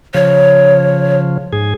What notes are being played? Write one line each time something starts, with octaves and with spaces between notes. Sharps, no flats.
C#3 F3 C#5
G#2 G#4